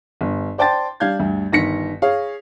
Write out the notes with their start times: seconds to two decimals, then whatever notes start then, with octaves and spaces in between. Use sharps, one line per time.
0.21 G1
0.58 C5 D5 G5 A5 C6 A6
1.00 G3 D4 F5 G6 G#6
1.19 D2 G2
1.52 G1 D#3 A#6 B6 C#7
2.02 G#4 C#5 F5